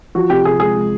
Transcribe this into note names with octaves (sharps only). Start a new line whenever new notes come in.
F3 F#4
C3 G4
C3 G#4
G#3 G#4
G#3